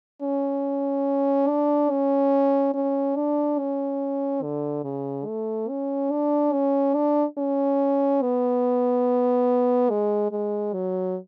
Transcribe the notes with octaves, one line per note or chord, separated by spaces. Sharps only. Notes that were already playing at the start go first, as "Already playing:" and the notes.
C#4
D4
C#4
C#4
D4
C#4
D3
C#3
A3
C#4
D4
C#4
D4
C#4
B3
G#3
G#3
F#3